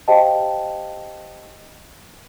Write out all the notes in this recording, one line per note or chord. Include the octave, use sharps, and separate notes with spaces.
G4 C5 D#5 F5 G5 A5